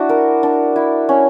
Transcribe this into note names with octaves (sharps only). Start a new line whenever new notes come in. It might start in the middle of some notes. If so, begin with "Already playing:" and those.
Already playing: D4 E4 F#4
A#4
D4
E4
C#4